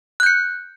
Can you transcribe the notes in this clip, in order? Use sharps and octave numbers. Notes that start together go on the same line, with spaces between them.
F#6 G6 C#7